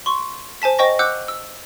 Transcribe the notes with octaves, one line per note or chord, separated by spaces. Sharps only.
C6 C#6
C5 G#5 A5 B6
C5 D#5 G5 C#6 A#6
F#5 D6 E6 F#6 G6
E6